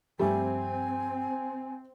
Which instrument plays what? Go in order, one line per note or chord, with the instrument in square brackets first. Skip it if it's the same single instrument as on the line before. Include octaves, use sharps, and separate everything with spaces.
[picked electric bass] G2 F3 [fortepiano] G3 A3 [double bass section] C4 [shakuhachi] G#5